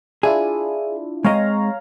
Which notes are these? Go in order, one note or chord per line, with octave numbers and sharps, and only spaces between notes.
D4 E4 F4 G#4
G#3 C4 C#5 D#5 F5 A#5